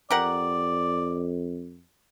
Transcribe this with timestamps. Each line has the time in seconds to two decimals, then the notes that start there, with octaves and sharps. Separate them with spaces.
0.11 F2 G4 A#4 D5 F#5